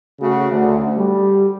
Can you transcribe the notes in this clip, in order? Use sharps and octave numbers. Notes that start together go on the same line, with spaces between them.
C#3 A3 F#4
D2
G3